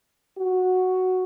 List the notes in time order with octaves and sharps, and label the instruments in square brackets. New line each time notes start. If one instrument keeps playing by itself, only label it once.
[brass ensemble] F#4